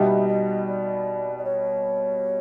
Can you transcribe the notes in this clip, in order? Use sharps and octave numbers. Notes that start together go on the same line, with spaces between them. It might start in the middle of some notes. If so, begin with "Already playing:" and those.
Already playing: B2 G3 B3 D#4 G4 E5
D#5
D5
D5
C#5